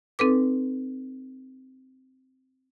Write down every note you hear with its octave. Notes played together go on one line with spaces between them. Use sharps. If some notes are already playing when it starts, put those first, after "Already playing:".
C4 D#4 A4 B4 D6